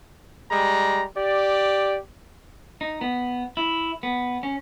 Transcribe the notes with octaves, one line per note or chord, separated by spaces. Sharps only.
G3 G#3 A#5
G4 D5
D#4
B3
E4
B3
C#4